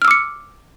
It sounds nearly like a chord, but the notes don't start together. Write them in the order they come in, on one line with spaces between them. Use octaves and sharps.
F6 E6 D6 C#7